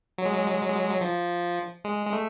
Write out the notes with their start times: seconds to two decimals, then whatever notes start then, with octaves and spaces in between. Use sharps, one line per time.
0.18 F#3
0.25 G#3
0.32 F#3
0.39 G#3
0.47 F#3
0.54 G#3
0.62 F#3
0.69 G#3
0.76 F#3
0.83 G#3
0.90 F#3
1.01 F3
1.84 G#3
2.06 G#3
2.13 A3